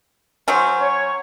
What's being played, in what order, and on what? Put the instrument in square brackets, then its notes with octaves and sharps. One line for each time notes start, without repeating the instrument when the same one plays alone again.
[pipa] F#3 C#4 [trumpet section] C5
[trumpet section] C#5